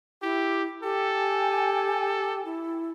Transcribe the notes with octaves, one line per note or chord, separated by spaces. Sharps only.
E4 G4
G4 A4 G5 G#5
E4